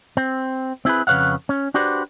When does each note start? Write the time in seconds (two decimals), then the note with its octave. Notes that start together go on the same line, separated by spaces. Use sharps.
0.17 C4
0.85 C4 E4 G#4 B4
1.07 F2 C#3 B4 C#5 F5 F#5
1.49 C#4
1.74 D4 F#4 G4 B4 C5 D5